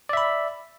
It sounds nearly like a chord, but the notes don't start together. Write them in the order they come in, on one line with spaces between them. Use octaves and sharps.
D5 E5 B5